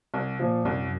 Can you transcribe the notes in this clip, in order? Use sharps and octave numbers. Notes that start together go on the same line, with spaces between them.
C2
A#2 F3
C2 F#2